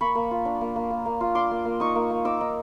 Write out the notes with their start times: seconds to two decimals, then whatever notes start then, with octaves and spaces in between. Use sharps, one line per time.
0.01 A#3 B5 C#6
0.15 A#3
0.31 F4
0.45 D4
0.61 A#3
0.76 A#3
0.91 A#3
1.06 A#3
1.21 F4
1.35 D4 C6 D6
1.51 A#3
1.65 A#3
1.80 D#4 C#6 D#6
1.95 A#3
2.11 A#3
2.25 D#4 D6 E6
2.41 D#4